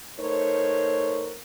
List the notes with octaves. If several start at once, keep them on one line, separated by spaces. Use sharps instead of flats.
A3 D#4 A#4 C5 C#5